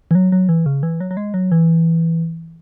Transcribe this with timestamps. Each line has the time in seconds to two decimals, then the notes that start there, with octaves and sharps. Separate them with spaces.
0.11 E3
0.15 F#3
0.32 F#3
0.49 E3
0.66 C#3
0.83 E3
1.01 F#3
1.11 F#3
1.17 G#3
1.34 F#3
1.52 E3